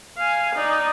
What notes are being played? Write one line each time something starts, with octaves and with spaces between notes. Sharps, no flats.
F5 G#5
D#4 D5